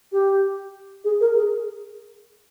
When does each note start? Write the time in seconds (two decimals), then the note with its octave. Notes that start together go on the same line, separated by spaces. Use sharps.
0.12 G4
1.04 G#4
1.21 A#4
1.36 G#4